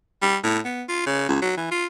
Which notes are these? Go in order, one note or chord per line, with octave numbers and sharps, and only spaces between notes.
G3
A2
B3
F4
C#3
C#2
F#3
E3
F4